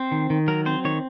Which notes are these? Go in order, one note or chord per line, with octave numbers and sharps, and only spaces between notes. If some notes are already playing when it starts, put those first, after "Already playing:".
Already playing: C4 C5
D#3
D#3
F#3 A#4
C4 C5
D#3 C#5